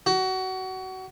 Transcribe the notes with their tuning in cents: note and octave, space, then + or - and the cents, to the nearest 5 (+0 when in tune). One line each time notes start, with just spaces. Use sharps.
F#4 +25